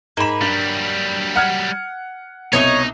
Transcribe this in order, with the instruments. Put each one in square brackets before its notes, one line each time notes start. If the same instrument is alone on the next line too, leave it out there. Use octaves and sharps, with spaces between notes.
[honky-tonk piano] G#2 E7 [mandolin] A#3 B5
[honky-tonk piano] G2 [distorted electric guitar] F#3 G3
[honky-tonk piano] F#5 F6 G#6
[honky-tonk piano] C2 B2 [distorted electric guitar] D#4 [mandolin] C#5 D#5 C#6